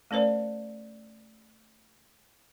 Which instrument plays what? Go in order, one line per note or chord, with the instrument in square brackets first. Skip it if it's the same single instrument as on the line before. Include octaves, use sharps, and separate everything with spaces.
[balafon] A3 C#4 A#4 C5 D5